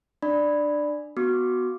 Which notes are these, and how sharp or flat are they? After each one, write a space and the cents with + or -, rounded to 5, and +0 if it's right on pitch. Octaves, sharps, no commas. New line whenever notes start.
D4 +20 D5 +5 B5 +0
B3 +0 F#4 +0 D6 +0